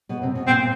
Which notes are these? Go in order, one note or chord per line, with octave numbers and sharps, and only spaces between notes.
B2 B3
C3 C4
B2 B3
A#2 A#3 C4